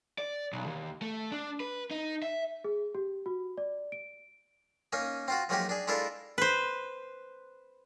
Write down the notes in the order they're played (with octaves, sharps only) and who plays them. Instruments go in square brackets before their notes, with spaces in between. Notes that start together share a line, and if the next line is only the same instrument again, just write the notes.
[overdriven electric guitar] D5
B1
D#2
A3
D4
B4
D#4
E5
[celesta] G#4
G4
F#4
D5
D7
[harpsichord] A#3 C#4 D#4
C4 F4 F#4
F3 F#3 G#3 A#3 D#4 G4
D4 G#4
G#3 D4 E4 F4 A4 A#4
[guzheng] B4 C5